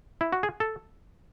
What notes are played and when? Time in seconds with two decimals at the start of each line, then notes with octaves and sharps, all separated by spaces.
0.21 E4
0.32 F#4
0.43 G#4
0.60 A4